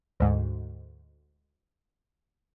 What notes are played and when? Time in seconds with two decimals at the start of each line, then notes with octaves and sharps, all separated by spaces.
0.20 D2 G#2